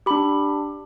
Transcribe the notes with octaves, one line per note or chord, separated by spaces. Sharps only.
D4 G4 B5